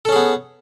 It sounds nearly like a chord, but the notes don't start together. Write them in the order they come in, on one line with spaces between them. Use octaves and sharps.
A4 C#4 G#4 B3